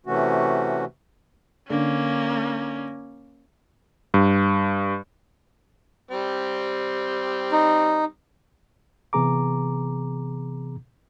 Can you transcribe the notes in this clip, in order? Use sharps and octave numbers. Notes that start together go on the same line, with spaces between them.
C3 E3 A3 C#4 F#4
D3 A#3 C#4
G2
G3 C4
D#4
C3 E3 B3 G#4 A#5 D6